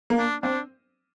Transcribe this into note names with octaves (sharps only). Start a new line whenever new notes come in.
A#3
D4
C4 D4